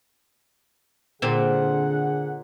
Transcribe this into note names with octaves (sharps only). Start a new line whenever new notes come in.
A#2 D3 C4 G#4 F#5